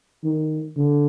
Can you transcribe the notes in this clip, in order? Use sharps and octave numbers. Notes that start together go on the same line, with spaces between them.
D#3
D3